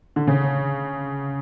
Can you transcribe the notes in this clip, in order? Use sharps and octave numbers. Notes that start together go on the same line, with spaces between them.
D3
C#3